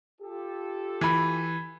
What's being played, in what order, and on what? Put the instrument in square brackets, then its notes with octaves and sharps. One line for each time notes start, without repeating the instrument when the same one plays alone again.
[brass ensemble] F4 G4 A4
[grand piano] E3 B5